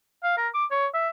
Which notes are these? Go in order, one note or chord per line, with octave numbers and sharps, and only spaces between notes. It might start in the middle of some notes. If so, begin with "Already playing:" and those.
F5
A#4
D6
C#5
E5